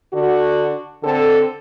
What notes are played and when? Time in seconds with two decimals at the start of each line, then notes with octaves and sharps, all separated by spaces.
0.13 D3 D4 F#4
1.04 D3 C4 A4